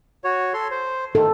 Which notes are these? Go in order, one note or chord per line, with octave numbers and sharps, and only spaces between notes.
F#4 C#5
A4 C6
C5
D#3 A4